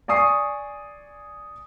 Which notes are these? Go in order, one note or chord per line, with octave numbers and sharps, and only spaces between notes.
D5 G#5 C#6 D#6 C7